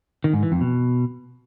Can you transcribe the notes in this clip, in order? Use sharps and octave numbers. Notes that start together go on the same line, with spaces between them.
D#3
G#2
E3
F2
B2